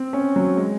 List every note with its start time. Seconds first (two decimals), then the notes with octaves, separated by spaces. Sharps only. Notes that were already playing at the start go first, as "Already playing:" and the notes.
Already playing: C4
0.13 C#4
0.36 F#3
0.57 G#3